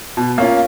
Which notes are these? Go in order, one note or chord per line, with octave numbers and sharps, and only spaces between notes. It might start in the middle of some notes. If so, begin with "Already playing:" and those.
B2
A#3 C#4 F4